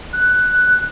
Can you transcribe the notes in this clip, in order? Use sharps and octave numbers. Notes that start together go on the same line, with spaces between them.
F#6